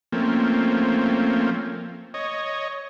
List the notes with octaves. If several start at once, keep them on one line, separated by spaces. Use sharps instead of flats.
F3 A3 A#3 C4 C#4
C#5 D#5